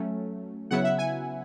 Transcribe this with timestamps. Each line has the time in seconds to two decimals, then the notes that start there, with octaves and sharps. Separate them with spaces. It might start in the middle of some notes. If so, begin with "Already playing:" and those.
Already playing: F#3 A3 C#4
0.71 C#3 F#3 B3 E4 F#5
0.84 E5
0.98 G#5